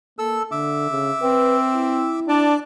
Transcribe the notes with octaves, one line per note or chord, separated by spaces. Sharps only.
A#3 A4 E6
D3 E5 D6 E6
C#3
C4 B4
E4
D4 D5 A5